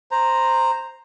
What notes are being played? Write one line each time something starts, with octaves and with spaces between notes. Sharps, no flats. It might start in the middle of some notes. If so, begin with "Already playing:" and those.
C5 A#5